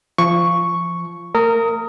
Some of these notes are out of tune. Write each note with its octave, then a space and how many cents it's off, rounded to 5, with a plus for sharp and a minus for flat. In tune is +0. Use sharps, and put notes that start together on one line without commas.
F3 -20 C#6 +0
A3 +40 A#4 -20 D#6 +15